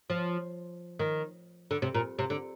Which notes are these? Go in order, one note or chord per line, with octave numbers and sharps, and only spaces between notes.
F3
D#3
D3
C3
A#2
C3
D3